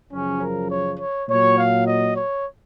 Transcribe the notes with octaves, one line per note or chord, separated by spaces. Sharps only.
F#2 C#3 F3 C#4
A#4
C#5
C#5
A#2 F#3 C#5
F5
D#5
C#5